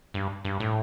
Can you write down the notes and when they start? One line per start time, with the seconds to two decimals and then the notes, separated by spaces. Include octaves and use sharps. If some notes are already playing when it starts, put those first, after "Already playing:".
0.14 G2
0.45 G2
0.60 A2